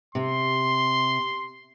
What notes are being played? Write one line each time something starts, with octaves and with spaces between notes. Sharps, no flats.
C3 C6